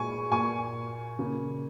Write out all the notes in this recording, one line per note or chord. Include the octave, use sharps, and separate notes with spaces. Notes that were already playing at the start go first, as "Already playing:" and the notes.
Already playing: A#2 G#3 G#5 C#6
A#2 A#3 G#5 C#6
C#3 A#3